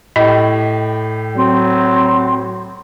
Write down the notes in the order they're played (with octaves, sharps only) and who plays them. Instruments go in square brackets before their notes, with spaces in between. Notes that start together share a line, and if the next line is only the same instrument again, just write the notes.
[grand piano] A2 G4 [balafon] D#5
[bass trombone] F#3 [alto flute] C4